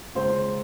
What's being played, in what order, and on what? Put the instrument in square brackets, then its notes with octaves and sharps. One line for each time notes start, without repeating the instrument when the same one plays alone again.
[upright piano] C#2 C5